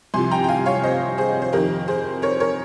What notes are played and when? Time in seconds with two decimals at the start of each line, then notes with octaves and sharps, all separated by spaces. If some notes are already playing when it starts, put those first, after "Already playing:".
0.14 C2 C3 F3 G#5 C6
0.31 G5 A#5
0.44 G5
0.49 F5 G#5
0.66 C#5 F5
0.83 C5 D#5
1.18 G#4 C5
1.42 C5
1.53 F2 D#3 G4 A#4
1.88 G#4 C5
2.22 A#4 C#5
2.40 A#4 C#5